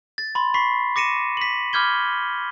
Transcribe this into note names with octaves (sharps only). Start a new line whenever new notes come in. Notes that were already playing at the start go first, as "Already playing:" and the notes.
A6
B5 C6
B5 C#6 B6 C7
D6 A#6 C#7 D#7 E7
B6 F#7
B5 D6 F6 G6 G#6 G7